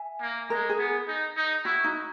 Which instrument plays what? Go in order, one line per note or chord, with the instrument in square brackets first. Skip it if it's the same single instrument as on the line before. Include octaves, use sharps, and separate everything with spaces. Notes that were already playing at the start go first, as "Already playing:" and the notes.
Already playing: [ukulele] E5 G#5
[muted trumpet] A#3
[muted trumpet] G#3 [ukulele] A#4
[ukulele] G#4
[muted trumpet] B3
D#4
D#4
[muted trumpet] E4 [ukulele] F#4
[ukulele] D#4